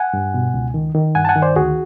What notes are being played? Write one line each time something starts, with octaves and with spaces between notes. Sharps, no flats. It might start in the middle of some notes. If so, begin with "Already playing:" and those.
Already playing: F#5 G#5
G2
B2
C#2
D#3
D#3
G2 F#5 G#5
A5
F#5 G#5
D#3
C5 D5
D2 F#4 G#4